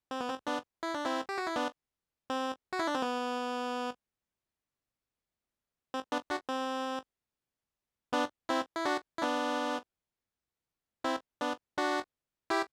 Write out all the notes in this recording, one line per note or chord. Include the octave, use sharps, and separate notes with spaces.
C4
B3
C4
B3 D4
E4
D4
C4 E4
G4
F#4
E4
B3 D4
C4
F#4
E4
D4
C4
B3
C4
B3 D4
D4 F#4
C4
B3 D4
C4 E4
E4
D4 F#4
E4
B3 D4
C4 E4
B3 D4
D4 F#4
E4 G4